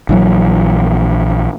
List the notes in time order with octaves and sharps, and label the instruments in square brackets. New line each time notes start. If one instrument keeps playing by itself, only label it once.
[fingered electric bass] A#1 E3 F#3